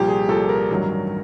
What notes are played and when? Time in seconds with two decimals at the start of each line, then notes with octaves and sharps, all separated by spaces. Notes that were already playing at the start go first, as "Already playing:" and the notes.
Already playing: C2 A#2 F3 G4
0.08 G#4
0.29 C2 A#2 F3 A4
0.49 A#4
0.70 A1 G2 D#3 F#3